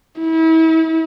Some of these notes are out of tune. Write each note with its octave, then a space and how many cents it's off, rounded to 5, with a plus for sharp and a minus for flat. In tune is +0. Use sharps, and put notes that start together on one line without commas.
E4 -35